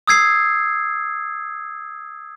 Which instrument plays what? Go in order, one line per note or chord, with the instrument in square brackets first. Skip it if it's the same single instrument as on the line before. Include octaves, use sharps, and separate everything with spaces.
[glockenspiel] D#6 E6 G#6 C7